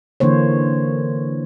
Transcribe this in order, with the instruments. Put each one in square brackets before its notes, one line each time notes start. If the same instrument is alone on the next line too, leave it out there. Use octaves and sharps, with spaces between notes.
[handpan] D3 E3 A#3 C5 C#5